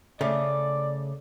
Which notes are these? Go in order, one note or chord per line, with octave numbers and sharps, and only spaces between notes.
C#3 A3 D5